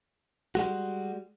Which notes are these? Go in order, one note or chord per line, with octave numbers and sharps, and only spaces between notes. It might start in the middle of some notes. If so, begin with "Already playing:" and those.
G3 G#3 F#4